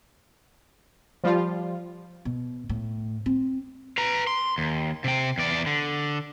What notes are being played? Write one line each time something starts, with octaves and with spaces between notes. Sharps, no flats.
F3 G3 F4
B2
A2
C4
B4 A#5
C6
D#2
C3 G5
E2 D5
D3